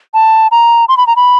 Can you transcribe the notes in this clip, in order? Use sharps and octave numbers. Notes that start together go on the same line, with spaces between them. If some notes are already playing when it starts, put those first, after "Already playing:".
A5
A#5
C6
B5
A#5
B5